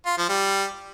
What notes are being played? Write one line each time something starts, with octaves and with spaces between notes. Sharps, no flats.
F4
F3
G3